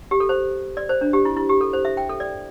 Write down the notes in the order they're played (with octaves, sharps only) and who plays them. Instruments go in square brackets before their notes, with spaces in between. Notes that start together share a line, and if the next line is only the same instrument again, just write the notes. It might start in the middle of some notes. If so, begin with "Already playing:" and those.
[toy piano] G4
A4
C5
D5
C5
D4
G4
E4
E4
G4
A4
C5
E5
G5
A4
D5